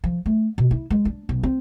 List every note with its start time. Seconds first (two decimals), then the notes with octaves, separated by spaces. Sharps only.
0.04 F3
0.26 A3
0.58 B2
0.71 E4
0.90 G#3
1.05 D4
1.29 B1
1.43 C4